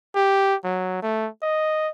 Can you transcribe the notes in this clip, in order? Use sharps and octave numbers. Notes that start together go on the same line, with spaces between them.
G4
F#3
A3
D#5